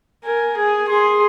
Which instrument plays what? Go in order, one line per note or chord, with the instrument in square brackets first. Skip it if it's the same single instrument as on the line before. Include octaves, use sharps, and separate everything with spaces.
[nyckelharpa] A#4 [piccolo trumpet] G#5
[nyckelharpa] G#4 [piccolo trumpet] G#5
[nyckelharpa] G#4 [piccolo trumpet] C6